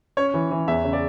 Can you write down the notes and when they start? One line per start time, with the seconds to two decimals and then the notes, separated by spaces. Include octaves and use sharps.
0.17 C#4 C#5
0.34 E3
0.51 E3
0.68 E2 E5
0.84 C#3
0.93 D5